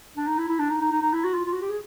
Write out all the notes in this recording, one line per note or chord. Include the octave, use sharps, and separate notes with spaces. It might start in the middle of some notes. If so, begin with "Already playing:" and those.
D4
D#4
E4
E4
D4
D#4
D#4
D#4
D#4
E4
F#4
F4
F4
F#4
G4
G#4